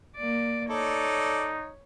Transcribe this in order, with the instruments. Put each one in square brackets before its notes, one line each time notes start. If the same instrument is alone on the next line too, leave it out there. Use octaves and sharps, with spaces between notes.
[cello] A#3 D5
[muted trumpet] D#4 [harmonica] A4 D5 [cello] C#5